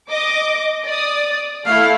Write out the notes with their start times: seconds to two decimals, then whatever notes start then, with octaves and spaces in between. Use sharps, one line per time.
0.10 D#5 D6
0.87 D5 D#6
1.66 A3 E4 F5